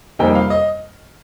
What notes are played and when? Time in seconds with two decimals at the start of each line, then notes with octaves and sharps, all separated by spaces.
0.19 F2 C3 G3 A#3 D#4 G5
0.35 F5
0.50 D#5